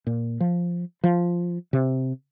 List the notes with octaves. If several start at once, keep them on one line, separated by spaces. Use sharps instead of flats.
A#2
F3
F3
C3